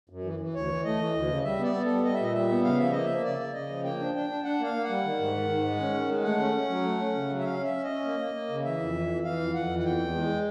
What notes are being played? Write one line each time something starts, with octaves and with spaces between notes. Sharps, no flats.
F#2
E3
E3
D2 C#5
E3
A3 D#5
E3
D2
C#3
G3 E5
B3 D5
B3
G3 A4
G3 D#5
E5
A#2 D#5
G3 E5
B3
C#3 F5
F3 E5
A#3 D#5
E5
A#3
C#3 D5
C#3
C#3 D#5
F3
A#3 G5
D4
D4 G5
D4
D4 F#5
A#3 F5
A#3
F#5
G3
D#3
G#2
D#3
G#2
G#3
C#4
D#3
G#3
A3 F#5
C#4
C#4
F#3
A3
C#4
C#3
F#3
E5
C#4 F5
C#4 E5
C#4
D#5
C#4
A#3
A#3
A#3
C#3
E3 E5
F2
E3
E3
E3 F5
F2
F2 F#5
E3
F#5
E2 G5
E2
G#3